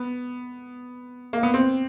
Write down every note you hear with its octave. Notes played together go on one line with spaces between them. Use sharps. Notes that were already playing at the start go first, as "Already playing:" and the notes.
Already playing: B3
A#3
B3
C4